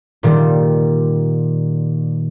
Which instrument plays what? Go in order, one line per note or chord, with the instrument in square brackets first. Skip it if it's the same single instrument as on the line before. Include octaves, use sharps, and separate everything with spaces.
[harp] A#2 D#3 G3